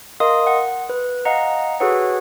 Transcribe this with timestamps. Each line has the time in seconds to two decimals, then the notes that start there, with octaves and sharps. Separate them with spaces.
0.20 A#4 D#5 F5 C6 D#6
0.47 F#5
0.89 B4
1.25 D#5 F5 F#5 A#5
1.80 F#4 G#4 A4 B4 C#5 F#5